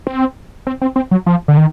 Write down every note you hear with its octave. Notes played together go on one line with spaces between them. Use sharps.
C4
C4
C4
C4
F#3
F3
D3
D#3